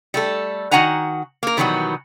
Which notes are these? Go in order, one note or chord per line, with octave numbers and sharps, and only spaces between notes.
G3 A3 A4
D#3 E4 F#4 F#5 G#5 A#5
A#3 A#4
B2 D#3 E3 F#3 G3 B3